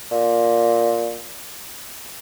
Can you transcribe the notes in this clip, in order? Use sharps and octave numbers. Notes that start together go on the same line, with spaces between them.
A#2